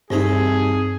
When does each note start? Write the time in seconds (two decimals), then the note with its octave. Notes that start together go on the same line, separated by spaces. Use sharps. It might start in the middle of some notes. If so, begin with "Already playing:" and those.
0.10 C2 G2 A3 D#4 G#4